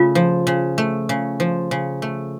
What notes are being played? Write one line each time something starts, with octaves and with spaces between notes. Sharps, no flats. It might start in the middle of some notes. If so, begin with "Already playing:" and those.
Already playing: C#3 A3 F4
F3
C#3
A3
C#3
F3
C#3
A3